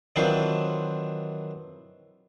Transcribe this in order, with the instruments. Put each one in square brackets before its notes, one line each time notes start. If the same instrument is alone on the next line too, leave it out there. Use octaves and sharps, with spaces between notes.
[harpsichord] D#3 E3 F#3 C4 D4 F4